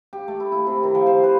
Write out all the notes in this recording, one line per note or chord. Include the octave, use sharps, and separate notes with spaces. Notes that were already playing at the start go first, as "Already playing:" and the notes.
G4
A3
E4
E4
C3
D#3
F3
C5
B4